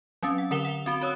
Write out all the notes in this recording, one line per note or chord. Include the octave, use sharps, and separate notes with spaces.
F#3 C4 C#4
F#5
D3 A#4 F#5 E7 F7 G7
F#5
C4 F#4
F#4 C#5 D#6 E6